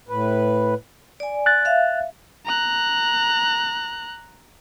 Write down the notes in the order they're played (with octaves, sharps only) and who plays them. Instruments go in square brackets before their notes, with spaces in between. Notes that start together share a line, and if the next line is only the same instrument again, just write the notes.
[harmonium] A2 B4
[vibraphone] D5 G#5
[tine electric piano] F#6 A6
[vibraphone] E5 F5
[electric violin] A#5 F#6